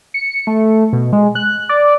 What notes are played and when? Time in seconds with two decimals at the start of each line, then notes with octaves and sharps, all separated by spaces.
0.14 C#7
0.47 A3
0.93 B2
1.13 G#3
1.35 F#6
1.69 D5